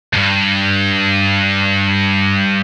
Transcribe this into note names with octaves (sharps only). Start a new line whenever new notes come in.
D2 G2